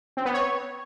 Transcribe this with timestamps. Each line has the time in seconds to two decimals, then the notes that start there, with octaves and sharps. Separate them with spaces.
0.17 C4
0.25 B3
0.34 C#5